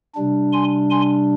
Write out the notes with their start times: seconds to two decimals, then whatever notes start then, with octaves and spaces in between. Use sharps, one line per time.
0.15 C3 G3 D4
0.53 G#5 C6
0.90 G#5 C6